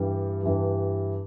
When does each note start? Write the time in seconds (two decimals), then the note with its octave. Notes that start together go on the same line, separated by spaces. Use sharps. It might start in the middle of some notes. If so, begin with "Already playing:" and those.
Already playing: G2 E3 G3
0.43 G2 E3 G3